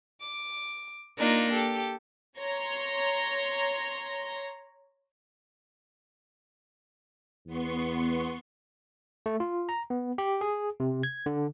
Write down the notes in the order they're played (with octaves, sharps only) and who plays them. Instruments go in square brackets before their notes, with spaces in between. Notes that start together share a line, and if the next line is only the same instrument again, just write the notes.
[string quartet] D6
A#3 D4 D#4 F4
G4 A4
[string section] C#5 A#5 C6
[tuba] E2 [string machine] B3 C6 C#6
[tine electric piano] A3
F4
A#5
B3
G4
G#4
C3
G#6
D3